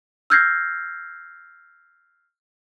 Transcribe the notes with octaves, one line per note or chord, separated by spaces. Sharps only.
E6 F6 G6 G#6 A#6 C7